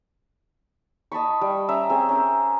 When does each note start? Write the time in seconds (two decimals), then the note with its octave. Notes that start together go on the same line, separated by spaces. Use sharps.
1.12 D#5 A5 B5 C#6
1.41 G3
1.69 C#4 E5 A#5
1.90 C4 G#4 C#5
2.09 C#4 A#4 C5